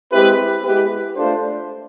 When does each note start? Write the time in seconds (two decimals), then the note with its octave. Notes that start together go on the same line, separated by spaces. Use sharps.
0.12 G#3 C4 E4 G4 B4
0.64 G#3 B3 E4 G4 B4
1.15 A3 D4 F4 A4 C5